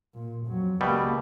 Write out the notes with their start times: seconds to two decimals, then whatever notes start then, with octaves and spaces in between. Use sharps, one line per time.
0.14 A#2
0.46 F2 F#3
0.81 C#2 B2 G3 A#3